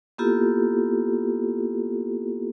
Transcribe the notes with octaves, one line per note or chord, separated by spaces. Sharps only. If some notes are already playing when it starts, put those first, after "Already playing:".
A#3 B3 E4 F4 G4 A4